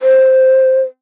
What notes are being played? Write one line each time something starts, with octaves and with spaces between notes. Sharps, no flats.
C5